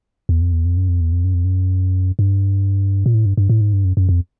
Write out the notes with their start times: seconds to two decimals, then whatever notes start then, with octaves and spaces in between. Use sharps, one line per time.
0.29 E2
0.41 F2
0.52 E2
0.65 F2
0.77 F#2
0.88 F2
1.01 E2
1.12 F2
1.24 F#2
1.34 F2
1.45 F#2
2.19 G2
3.06 A#2
3.14 A2
3.26 G2
3.37 G2
3.49 A2
3.61 G#2
3.73 G2
3.85 F#2
3.97 F#2
4.09 F2